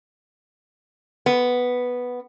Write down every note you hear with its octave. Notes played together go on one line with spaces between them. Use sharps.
B3